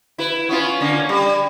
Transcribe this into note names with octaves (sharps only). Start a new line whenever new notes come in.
E4 B4
B3 C#4 F4
D3 A#3 C#4
G3